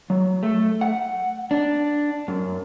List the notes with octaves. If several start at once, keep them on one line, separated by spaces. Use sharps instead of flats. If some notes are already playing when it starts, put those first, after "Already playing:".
F#3
A3
F#5
D4
F#2